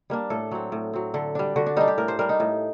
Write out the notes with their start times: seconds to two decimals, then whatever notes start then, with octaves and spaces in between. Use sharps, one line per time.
0.10 G3 A#3 D4
0.30 A2 A4
0.51 F#3 C4
0.72 A2
0.93 F#3 C4
1.14 D3 A4
1.35 G3 D4
1.56 D3 F#4
1.66 D4
1.77 G3 D4 D#4
1.88 G4
1.98 A2 A#4
2.08 C5
2.19 G3 D4 A#4
2.29 D#4
2.40 A2